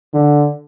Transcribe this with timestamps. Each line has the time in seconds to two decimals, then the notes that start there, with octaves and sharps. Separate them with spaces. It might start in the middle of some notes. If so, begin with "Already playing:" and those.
0.14 D3